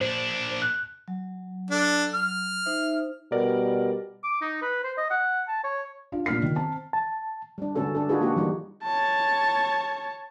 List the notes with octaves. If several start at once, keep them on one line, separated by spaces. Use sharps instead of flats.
A#2 D4 C5
F#6
F#3
D4 A4
F6
D#4 C5 E5
B2 G3 A#4 D5
D6
D#4
B4
C5
D#5
F#5
A5
C#5
D4 F4
A#2 D4 F6 B6 C7
D#3
C4 A5 A#5
A5
G3 D4
D3 G#3 C#4 F#4 A4 B4
D4 A4
D4 D#4 F4 F#4 G#4 B4
G#3 A#3 D4 D#4 F#4 G4
E3 F#3 G3 D#4
C#5 A5